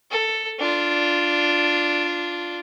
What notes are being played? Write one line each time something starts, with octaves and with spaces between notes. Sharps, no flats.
A4
D4 F4